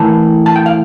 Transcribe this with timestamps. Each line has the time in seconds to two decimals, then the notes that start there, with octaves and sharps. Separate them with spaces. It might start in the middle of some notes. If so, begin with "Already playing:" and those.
Already playing: A2 E3 A#3 E4 A5
0.46 A5
0.56 G5
0.66 F5